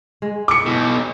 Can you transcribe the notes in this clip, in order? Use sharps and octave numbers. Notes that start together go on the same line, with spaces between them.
G#3
D6 C#7
B1 B2 E3 C#4